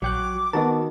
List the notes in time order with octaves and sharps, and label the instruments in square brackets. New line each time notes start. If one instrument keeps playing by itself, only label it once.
[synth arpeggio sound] A#1 G5 F#6 [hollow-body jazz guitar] F#3 [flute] D6
[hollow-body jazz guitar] D#3 [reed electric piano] B3 F#4 A#4 [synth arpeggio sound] D#5 A5